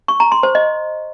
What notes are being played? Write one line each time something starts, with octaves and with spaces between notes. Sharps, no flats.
C#6
A#5
C6
C5
D#5